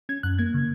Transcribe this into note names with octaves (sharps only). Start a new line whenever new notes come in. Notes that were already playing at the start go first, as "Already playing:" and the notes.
C#4 G#6
F#2 F#6
A#3 G#6
C#3